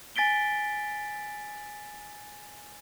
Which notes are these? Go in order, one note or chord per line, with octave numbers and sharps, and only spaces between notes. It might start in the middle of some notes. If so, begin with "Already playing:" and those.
G#5 A6 B6 D7 G7